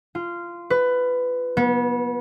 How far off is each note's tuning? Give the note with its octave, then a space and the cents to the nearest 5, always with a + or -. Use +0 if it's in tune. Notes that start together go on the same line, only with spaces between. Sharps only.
F4 -15
B4 +15
B3 -30